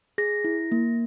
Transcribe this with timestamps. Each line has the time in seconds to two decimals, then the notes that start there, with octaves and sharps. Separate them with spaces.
0.18 G#4 A#6
0.44 E4
0.72 A#3